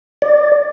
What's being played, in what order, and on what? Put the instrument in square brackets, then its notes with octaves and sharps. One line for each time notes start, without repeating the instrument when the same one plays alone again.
[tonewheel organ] D5